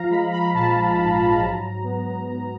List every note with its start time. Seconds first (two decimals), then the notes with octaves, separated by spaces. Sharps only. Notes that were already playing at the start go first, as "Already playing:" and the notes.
Already playing: F3 F5 A#5
0.11 G#3 B5
0.33 B5
0.53 A#1 A5
0.96 G#2
1.40 F#3 A#5
1.84 B3